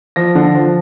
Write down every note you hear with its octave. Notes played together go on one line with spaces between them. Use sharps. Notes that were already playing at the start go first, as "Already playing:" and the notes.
F3 A#6
D3
F3